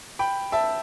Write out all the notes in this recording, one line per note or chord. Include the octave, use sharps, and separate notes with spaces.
G5 B5
E5 A5